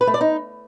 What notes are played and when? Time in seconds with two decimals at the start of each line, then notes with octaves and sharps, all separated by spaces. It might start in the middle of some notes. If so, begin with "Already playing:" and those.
0.01 B4
0.07 A3
0.14 D5
0.21 D#4